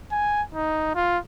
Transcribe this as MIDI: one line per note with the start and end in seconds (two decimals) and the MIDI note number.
0.12 0.42 80
0.55 0.94 63
0.95 1.18 65